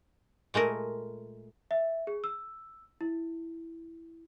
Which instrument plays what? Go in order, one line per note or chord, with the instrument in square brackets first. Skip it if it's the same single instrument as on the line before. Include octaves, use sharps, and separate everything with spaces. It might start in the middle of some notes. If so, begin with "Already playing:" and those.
[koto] A#2 G#3 A3 A#4
[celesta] E5
G#4
E6
E4